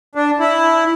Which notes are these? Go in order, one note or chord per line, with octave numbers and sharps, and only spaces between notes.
D4
E4